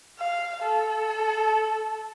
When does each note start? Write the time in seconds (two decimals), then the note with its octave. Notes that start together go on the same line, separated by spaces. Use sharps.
0.19 F5
0.63 A4